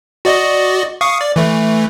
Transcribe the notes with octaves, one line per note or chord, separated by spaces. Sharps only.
F#4 D5 D#5
F5 C#6 D#6
D5
E3 A3